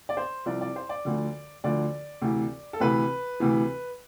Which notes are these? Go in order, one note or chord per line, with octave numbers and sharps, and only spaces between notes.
D5
C5
C2 C3 F3 D5
D5
C5
D5
D2 D3 F3
D2 D3 F3 D5
D2 C3 E3
A4
D2 C3 E3 B4
D2 C3 E3